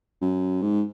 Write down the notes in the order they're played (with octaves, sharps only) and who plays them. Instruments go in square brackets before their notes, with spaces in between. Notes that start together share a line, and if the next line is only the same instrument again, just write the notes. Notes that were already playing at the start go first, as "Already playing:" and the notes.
[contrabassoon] F#2
G#2